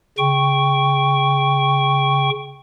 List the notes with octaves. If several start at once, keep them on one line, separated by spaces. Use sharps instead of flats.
C#3 G5 C#6